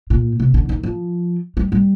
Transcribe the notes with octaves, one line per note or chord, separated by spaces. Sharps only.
A#2
C3
D3
D#3
F3
G3
G3